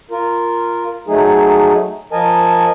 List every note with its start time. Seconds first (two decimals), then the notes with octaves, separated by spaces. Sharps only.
0.11 F4 A#4
1.08 F#3 A3 D#4 G#4
2.12 F3 A#4 D#5 G#5 A5